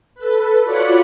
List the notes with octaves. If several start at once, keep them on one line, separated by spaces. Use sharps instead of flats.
A4 B4
F4 F#4 C#5 D5 F#5 B5